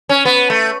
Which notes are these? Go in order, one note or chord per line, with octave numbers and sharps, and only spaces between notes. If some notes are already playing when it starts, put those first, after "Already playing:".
C#4
B3
A3